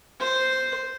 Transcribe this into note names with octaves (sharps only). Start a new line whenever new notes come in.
C5